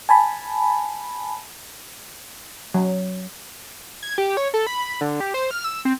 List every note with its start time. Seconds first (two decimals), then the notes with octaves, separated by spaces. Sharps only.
0.09 G#5 A5 B5
2.74 F#3
4.03 G#6
4.18 G4
4.37 C#5
4.54 A4
4.67 B5
5.01 D3
5.20 G4
5.34 C5
5.51 F6
5.64 E6
5.85 C4